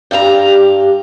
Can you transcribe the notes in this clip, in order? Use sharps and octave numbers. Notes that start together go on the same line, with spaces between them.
G2 G4 A4 A#5